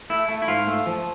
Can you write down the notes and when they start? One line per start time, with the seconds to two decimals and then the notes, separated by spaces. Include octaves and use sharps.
0.10 A3 E4
0.28 A3
0.42 E4
0.48 G#2 F4
0.67 A3
0.86 F3